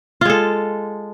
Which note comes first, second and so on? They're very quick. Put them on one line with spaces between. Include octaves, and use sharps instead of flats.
F4 G#3 A4